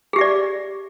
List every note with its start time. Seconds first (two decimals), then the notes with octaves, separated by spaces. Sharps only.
0.13 G#4
0.16 G4
0.19 E5
0.21 D5